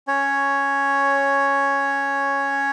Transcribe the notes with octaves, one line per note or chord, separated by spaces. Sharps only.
C#4 C#5